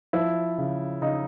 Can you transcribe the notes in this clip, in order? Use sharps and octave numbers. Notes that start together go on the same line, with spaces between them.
F3 E4
C#3
C#3 D#4